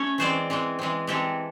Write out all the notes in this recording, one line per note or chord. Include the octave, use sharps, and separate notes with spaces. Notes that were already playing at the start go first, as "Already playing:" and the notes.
Already playing: A3 C#4 C#5
E3 G#3 C4 C5 D5
E3 G#3 C4
E3 G#3 C4
E3 G#3 C4 G4 A4